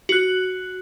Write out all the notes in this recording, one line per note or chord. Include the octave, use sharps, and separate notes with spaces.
F#4 F#6